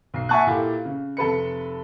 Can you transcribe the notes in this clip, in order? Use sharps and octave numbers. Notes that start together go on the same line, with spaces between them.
B1 C7
E5 F#5 G#5 A5 C#6 F#6
A#2 A#3 E4 G4 A4
C#3
F1 A4 B4 C#7